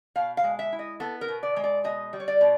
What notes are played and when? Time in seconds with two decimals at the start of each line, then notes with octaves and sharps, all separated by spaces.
0.16 B2 F5
0.37 F5
0.44 G#3
0.59 E5
0.72 E4
0.79 D#5
1.00 B3 A4
1.21 A#4
1.28 B2
1.43 D5
1.56 G#3
1.64 D5
1.84 B2 D#5
2.13 G3
2.20 C#5
2.28 D5
2.41 B2